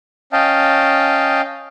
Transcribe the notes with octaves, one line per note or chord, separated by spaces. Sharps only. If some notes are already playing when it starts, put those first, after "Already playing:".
C#4 D#5 F5 G5 A5